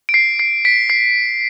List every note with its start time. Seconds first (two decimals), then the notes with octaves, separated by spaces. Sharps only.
0.09 D7
0.14 C7
0.39 C7
0.65 B6 D7
0.90 C7